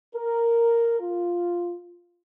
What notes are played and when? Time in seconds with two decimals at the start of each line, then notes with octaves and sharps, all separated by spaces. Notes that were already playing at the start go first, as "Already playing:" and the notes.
0.15 A#4
1.00 F4